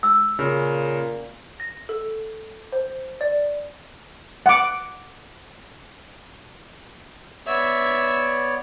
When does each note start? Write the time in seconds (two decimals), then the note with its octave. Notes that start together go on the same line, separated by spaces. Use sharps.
0.03 E6
0.39 A#2 C#3
1.60 A#6
1.89 A4
2.72 C5
3.21 D5
4.46 F#5 D6
7.47 B3 C#5 D5 E5 G#6